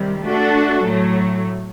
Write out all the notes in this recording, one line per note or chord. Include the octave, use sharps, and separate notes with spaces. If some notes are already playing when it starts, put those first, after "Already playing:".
Already playing: C3 D#3 G3
A3 D4 F#4 A4
A2 F#3 A3